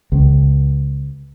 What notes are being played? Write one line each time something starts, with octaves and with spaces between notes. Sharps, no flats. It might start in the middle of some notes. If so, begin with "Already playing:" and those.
C#2